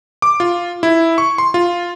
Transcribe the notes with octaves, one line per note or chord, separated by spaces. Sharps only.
D6
F4
E4
C#6
C6
F4